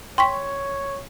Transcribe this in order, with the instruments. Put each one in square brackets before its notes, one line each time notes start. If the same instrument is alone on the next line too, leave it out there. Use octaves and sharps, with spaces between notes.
[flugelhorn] C#5 [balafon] G5 [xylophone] C6 C#6 B6